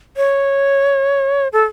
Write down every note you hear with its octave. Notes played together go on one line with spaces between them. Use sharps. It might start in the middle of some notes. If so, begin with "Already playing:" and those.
C#5
A4